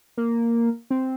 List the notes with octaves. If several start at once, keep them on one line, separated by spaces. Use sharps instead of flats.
A#3
C4